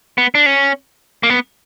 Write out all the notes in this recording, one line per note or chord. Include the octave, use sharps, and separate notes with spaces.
B3
D4
C#4
A#3
B3